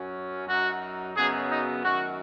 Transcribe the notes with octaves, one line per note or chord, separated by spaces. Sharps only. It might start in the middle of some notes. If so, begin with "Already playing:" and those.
Already playing: F#2 F#3 C#4
F#2 F#3 D#4 F#4
F#2 C#3 F#3 B3 D#4 G#4
D#4
F#2 D#3 F#3 F#4